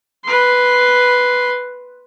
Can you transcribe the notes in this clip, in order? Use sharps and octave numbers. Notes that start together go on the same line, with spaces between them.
B4 C6